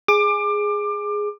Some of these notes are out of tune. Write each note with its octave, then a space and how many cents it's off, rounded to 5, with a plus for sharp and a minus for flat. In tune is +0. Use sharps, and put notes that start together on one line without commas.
G#4 +0 D6 +25